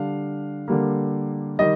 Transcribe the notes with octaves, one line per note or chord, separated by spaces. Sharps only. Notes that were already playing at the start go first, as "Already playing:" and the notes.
Already playing: D3 G3 D4 F5
D3 G3 A#3
D#3 G3 D#5